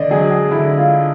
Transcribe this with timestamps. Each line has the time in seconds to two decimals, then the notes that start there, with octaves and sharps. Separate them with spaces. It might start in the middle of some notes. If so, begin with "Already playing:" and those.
Already playing: D3 D5 D#5
0.10 F#3 G#4
0.31 G#4
0.51 D3 E4
0.77 F4